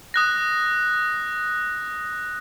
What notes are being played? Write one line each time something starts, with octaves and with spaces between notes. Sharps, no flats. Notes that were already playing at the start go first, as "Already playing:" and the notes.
D#6 F#6 A#6